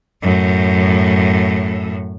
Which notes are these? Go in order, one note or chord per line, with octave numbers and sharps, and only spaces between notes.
F#2 A2